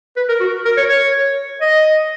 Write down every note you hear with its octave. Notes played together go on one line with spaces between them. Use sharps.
B4
A#4
F#4
A#4
C#5
C#5
D#5